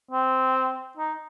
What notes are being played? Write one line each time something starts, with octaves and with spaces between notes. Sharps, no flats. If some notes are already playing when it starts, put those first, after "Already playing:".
C4
D#4